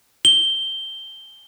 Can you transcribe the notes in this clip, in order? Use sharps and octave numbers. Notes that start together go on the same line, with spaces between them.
G7